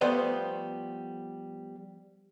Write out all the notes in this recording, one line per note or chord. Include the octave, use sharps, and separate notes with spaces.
F3 G3 A3 B3 C5 D#5